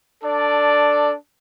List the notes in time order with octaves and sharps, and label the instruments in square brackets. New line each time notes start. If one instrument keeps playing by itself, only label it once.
[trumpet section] D4 A4 D5